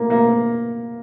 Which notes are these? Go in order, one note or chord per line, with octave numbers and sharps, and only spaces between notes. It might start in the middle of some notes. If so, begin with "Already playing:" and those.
Already playing: A#3
A#3